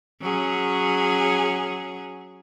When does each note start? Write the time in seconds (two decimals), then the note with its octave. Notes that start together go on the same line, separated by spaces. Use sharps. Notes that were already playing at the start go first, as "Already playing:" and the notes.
0.21 F#3 C#4 G#4